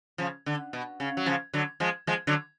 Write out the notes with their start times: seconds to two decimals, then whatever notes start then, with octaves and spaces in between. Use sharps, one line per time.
0.18 C#3 F3
0.46 D3
0.73 B2
1.00 C#3
1.17 F#3
1.26 C#3 F3
1.53 D3 F#3
1.80 F3 G#3
2.07 F3 G#3
2.27 D3 F#3